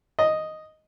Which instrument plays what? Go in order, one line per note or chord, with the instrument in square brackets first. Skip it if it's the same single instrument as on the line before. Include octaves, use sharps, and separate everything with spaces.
[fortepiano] D#5